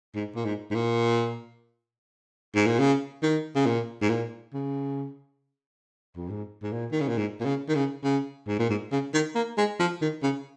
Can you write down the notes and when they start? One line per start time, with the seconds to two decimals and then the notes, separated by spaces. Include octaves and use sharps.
0.15 G#2
0.35 A#2
0.45 G#2
0.70 G#2
0.75 A#2
2.55 G#2
2.66 A#2
2.79 C#3
3.23 D#3
3.55 C#3
3.66 A#2
4.01 G#2
4.09 A#2
4.54 C#3
6.16 F2
6.30 G#2
6.63 G#2
6.72 A#2
6.92 D#3
7.00 C#3
7.08 A#2
7.17 G#2
7.40 A#2
7.45 C#3
7.69 D#3
7.75 C#3
8.04 C#3
8.47 G#2
8.59 A#2
8.69 G#2
8.92 C#3
9.14 D#3
9.35 A#3
9.58 G#3
9.79 F3
10.01 D#3
10.23 C#3